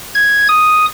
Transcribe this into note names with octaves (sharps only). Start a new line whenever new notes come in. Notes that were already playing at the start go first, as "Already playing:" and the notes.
G#6
D#6